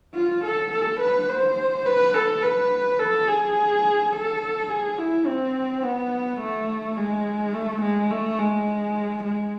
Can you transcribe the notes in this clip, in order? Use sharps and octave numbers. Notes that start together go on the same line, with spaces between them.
F4
A4
A4
B4
C5
B4
A4
B4
A4
G#4
A4
G#4
E4
C4
B3
A3
G#3
A3
G#3
A3
G#3
G#3